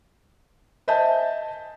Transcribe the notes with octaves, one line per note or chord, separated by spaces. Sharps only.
C5 D#5 E5 G#5 A5 G6